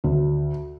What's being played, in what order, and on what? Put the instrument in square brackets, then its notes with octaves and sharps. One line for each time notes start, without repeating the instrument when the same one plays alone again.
[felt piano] D2